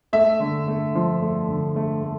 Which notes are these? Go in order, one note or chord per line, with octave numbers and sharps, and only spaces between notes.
A3 E5
D3
A3
F3
A3
D3
A3
A3